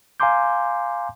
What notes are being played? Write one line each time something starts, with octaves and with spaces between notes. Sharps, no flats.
F5 G#5 A#5 C6 D6 G6